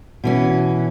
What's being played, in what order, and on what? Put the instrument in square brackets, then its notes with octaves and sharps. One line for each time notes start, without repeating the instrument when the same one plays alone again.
[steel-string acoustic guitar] B2 E3 C#4